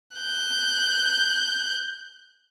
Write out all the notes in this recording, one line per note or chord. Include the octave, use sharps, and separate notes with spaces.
F#6 G6